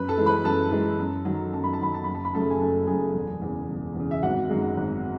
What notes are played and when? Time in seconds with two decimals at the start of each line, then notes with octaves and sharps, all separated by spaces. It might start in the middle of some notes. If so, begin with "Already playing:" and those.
Already playing: F#2 B4 B5
0.09 A4 A5
0.18 E3 G#3
0.26 B4 B5
0.44 F#2 A4 A5
0.71 E3 G#3
0.99 F#2
1.25 D#3 F#3
1.53 F#2 A5
1.64 B5
1.73 A5
1.79 D#3 F#3 B5
1.94 A5
2.04 F#1 B5
2.15 A5
2.25 B5
2.33 F#2 C#3 F#3 A3 A4 A5
2.50 G#5
2.60 F#1 A4 A5
2.87 F#2 C#3 F#3 A3 G#4 G#5
3.15 E1
3.42 E2 C#3
3.69 E1
3.95 E2 C#3
4.11 E5
4.22 G#1 F#4 F#5
4.50 F#2 D#3 G#3
4.77 G#1